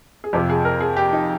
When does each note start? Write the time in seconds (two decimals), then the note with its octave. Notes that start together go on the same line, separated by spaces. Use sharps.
0.24 G#4
0.33 F2 C3 F3 G4
0.50 G#4
0.65 A#4
0.81 G#4
0.97 G4
1.13 D#4